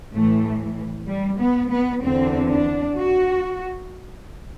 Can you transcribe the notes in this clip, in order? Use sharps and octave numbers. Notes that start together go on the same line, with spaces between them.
A2 E3 A3
G3
B3
B3
E2 D3 C4
D4
F#4